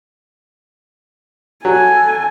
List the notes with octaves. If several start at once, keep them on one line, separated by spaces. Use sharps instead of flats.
F#3 A4 G#5